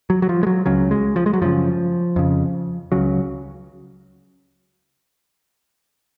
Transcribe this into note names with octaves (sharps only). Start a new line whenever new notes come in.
F#3
F#3
F3
G#3
F#3
C#2 C#3 F#3
G#3
F3
G#3
F#3
F#2 C#3 F3
F2 C#3
C#2 C#3 F#3